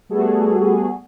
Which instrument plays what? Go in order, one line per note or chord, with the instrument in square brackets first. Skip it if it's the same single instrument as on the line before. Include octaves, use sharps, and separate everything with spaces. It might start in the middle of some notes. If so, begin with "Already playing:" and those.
[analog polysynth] G3 A3 B3 F#4 G#4 A4